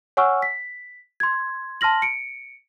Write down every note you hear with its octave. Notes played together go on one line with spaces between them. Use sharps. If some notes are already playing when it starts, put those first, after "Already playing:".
C#5 F#5 G#5 C#6 E6 F6
B6
C6 G#6
A5 C6 F6 A#6 F#7
C#7 D7